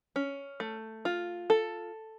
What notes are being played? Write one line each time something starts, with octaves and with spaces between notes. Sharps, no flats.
C#4
A3
F4
A4